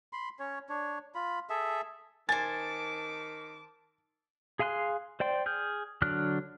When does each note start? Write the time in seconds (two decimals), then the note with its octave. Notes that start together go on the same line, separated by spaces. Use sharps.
0.13 B5 C6
0.39 C#4 C#5
0.69 D4 C#5
1.15 F4 B5
1.50 G#4 A4 E5
2.29 D#3 C5 G#5 A5 D6 A6
4.59 G#4 F5 G#5 C6 F#6
5.20 C5 D5 G5 C6
5.46 G#4 F6 G6
6.02 D3 F#3 D4 F6 F#6